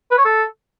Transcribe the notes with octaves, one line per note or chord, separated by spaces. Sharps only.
B4
C#5
A4